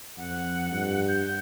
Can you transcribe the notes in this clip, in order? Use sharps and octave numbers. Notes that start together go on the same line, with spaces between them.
F2 F#5
G2
G6